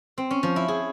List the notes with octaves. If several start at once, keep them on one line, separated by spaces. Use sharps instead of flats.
C4
C#4
F3
E4
G#4